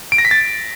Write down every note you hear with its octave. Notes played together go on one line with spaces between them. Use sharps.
D7
A#6
B6
A6